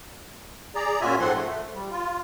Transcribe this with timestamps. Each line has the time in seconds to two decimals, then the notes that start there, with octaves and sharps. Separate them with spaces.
0.75 G#4 D5 A#5
1.01 A#2 C#4 F4 F#4 E5 G#5
1.20 G#2 F3 C4 A4 F#5 C6
1.35 A3
1.75 G3
1.91 F4